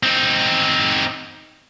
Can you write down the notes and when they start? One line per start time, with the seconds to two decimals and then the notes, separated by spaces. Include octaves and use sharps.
0.03 C4 D#4